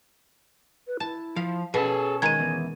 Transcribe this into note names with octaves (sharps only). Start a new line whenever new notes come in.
B4
E4 A5
F3 F5
B2 C#4 G#4 A4
D#3 G#3 G#6 D#7
E2